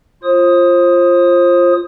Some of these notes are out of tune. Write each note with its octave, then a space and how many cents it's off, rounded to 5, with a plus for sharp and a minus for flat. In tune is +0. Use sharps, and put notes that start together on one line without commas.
F4 -10 C5 +30 D#6 +0